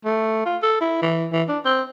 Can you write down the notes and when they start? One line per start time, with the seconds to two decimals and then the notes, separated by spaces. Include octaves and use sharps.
0.05 A3
0.46 F4
0.62 A4
0.81 E4
1.02 E3
1.32 E3
1.49 D4
1.65 C4